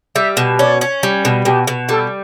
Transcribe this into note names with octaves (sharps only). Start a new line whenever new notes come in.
G3 E5
B2
C#4 D5
C#4
G3
B2
B2 G4
B2
G3 A4